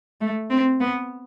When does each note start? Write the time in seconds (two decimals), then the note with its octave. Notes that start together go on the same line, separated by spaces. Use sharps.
0.21 A3
0.50 C4
0.81 B3